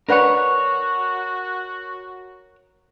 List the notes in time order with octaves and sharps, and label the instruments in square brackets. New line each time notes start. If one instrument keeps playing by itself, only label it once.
[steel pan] D4 B4 F#5 [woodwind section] F#4 [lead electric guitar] A#4 C#5